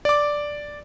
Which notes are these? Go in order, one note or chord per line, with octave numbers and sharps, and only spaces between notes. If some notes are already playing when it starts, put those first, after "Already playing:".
D5 D6